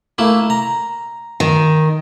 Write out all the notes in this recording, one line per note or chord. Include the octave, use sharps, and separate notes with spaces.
A3 A#3 E4
A#5
D#3